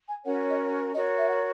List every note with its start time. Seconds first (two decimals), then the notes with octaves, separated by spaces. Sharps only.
0.08 G#5
0.25 C#4 F#4 A#4 C#5 F#5
0.49 D#5
0.72 C#5
0.94 F#4 A#4 C#5 D#5
1.17 E5
1.28 F#5